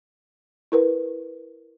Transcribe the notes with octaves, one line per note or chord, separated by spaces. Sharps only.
E4 A#4 B4